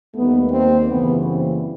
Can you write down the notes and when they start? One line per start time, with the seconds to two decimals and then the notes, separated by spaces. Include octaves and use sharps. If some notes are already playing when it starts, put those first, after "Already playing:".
0.14 D#2 D#3 G3 A3 B3
0.51 A#3 C4
0.88 F#2 C#3 E3 G3 A3 B3
1.26 A#3 C4